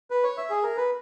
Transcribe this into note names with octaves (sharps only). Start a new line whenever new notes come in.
B4
C#5
E5
G#4
A#4
B4